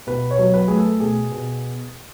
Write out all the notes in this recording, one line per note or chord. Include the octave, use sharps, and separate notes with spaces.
B2 B4
C#5
F#3
B4
A3 G#4
A4
B2 G#4
B2